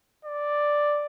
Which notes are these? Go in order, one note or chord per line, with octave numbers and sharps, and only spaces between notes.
D5